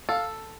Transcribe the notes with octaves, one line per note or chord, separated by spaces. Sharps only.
A4 F5